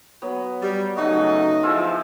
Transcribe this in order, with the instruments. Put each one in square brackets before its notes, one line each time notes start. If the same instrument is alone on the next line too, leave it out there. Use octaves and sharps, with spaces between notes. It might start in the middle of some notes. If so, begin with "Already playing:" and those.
[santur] F#3 B3
[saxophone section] G3
[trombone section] C#3 F#3 A3 [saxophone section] D#4 D#5 [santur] F#4
[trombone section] F3 E4 G#4 [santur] F4 E6